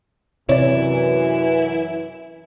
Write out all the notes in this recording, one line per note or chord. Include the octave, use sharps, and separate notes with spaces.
F#2 C3 E3 E4 C#5 D5